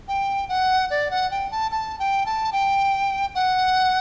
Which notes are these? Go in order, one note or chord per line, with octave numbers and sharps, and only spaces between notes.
G5
F#5
D5
F#5
G5
A5
A5
G5
A5
G5
F#5